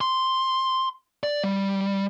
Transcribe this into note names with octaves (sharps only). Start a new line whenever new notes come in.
C6
D5
G3